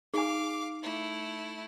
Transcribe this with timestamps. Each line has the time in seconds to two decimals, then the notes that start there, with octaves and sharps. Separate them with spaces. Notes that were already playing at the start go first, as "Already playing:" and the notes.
0.14 D#4 G#4 F5 G#5 D6
0.83 A3 E4